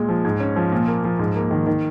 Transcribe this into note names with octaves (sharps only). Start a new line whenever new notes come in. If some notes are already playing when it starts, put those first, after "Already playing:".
Already playing: A#2 G#3
F3
G#2
C#4
F3
A#2
A#3
F3
G#2
A#3
D#3
D#3